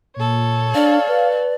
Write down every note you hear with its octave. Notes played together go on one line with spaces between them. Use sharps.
A#2 A4 C#5
D4 D5 F5
B4